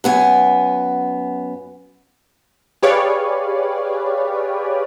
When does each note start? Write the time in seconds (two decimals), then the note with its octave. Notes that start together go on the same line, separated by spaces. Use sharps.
0.04 F#2 B3 G#5
2.83 G4 G#4 B4 C#5 D5 F5